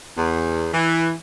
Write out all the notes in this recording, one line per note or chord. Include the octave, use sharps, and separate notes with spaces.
E2
E3